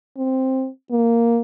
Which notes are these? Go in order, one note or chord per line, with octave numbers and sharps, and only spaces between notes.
C4
A#3